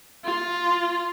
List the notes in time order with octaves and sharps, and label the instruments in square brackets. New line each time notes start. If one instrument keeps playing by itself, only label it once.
[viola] F4